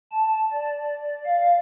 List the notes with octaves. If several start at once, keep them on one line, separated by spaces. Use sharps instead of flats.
A5
D5
F5